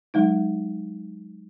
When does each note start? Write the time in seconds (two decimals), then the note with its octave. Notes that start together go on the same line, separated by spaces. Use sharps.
0.14 F#3 G#3 D#4